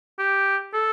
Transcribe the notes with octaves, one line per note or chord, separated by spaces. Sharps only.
G4
A4